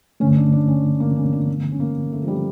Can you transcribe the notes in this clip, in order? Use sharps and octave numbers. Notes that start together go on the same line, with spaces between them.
G2 D3 A3 C#4
D4
D4
C#4
C#4
A#3
C#4
D4
C#4
A#3
A3
F3
G3